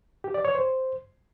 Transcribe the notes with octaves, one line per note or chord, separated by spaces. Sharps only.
G4
D5
C#5
C5